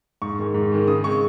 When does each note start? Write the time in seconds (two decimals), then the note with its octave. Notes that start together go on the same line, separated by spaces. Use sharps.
0.22 G#2 C#6
0.38 D#3 G#3
0.54 G#2
0.72 D#3 G#3
0.87 C#3 D#6
1.04 G#3 C4 C#6